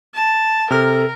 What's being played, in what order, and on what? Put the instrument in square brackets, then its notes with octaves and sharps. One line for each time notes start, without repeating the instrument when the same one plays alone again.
[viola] A5
[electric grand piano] C3 F6 [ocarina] A4 [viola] A#4